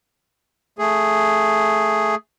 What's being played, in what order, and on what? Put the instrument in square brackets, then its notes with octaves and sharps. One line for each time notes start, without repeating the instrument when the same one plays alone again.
[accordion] A3 G#4